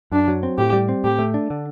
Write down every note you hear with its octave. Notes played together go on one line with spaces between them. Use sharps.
F#2 D4
F#3
C4
A2 G4
G3
C4
A2 G4
A3
D4
D3